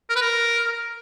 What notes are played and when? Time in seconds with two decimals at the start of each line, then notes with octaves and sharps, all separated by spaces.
0.10 A#4
0.16 B4
0.22 A#4